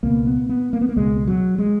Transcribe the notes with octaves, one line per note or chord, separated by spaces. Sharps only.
C#2 B2 A#3
B3
B3
A#3
B3
A#3
C#2 B2 G#3
F#3
G#3